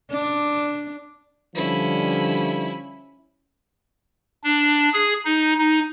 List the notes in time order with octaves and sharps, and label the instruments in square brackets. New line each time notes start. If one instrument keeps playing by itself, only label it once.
[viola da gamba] D4
[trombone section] D3 F3 G3 [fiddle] C#4 E4
[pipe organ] D4
G#4
D#4
D#4